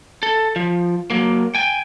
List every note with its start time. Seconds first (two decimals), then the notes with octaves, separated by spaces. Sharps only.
0.23 A4
0.56 F3
1.10 F#3 A#3
1.55 G5 G#5